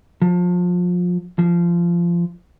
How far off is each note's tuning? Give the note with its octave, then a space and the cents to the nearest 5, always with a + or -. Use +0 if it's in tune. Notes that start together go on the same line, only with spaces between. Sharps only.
F3 +30
F3 -20